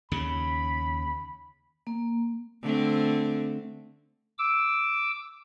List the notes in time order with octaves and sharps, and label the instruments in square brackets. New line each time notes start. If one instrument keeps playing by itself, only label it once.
[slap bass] D#2 C#3 [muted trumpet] B5
[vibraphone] A#3
[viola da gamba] D3 A3 C4
[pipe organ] D6 E6